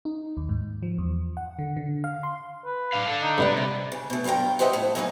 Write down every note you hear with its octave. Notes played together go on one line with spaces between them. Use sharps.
D#4
D#2
G#2
F3
E2
F#5
D3
D3
F5
C6
B4
D4 F5
D4 A4
D#4
G2 B2 G3 B4
C3
C#3
B2 A3
G2 F#3 F4 A#4 G5
G4 B4 C5 D#5 E5 F#5
F2 A2
F#2 E3 F#3 A#3 D#4